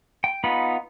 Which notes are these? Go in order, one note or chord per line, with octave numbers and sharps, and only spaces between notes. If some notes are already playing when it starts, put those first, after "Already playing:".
G5
B3 D#4 F4 B5